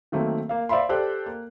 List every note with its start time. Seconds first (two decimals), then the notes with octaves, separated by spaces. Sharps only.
0.12 D#3 F#3 A3 A#3 C4
0.49 A#3 F5
0.69 C5 D5 E5 F5 B5 C6
0.89 G4 A4 C5 D5 G5 F#6
1.26 A#3